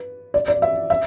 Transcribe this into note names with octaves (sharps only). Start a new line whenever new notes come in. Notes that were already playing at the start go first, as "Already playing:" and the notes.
Already playing: B4
D5
D5
E5
E5